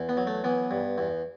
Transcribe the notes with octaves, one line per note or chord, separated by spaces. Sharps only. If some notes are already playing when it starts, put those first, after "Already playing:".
Already playing: E2
B3
F#3
A3
E3 B3
G2
E2